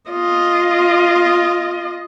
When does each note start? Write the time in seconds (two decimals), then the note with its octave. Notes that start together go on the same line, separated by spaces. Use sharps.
0.11 F4 D#5